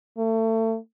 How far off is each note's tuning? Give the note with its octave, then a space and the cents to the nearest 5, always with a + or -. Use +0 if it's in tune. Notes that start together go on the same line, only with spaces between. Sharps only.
A3 +30